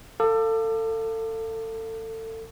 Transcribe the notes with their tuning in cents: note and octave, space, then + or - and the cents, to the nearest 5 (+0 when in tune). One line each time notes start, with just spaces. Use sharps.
A4 +30 F5 +0 D6 +30